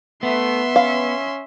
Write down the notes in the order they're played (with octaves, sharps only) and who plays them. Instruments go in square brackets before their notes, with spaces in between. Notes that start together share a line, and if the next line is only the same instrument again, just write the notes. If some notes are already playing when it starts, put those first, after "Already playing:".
[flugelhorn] A3 [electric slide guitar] B3 [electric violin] E5 C6
[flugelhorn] C#4 [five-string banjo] F5